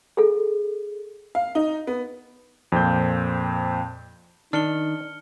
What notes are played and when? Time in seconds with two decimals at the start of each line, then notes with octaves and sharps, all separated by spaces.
0.17 G#4 A4
1.35 F5
1.55 D#4
1.87 B3
2.72 F2 A#2 C4 G6
4.53 D#3 D4 D#4 F6 C#7 G7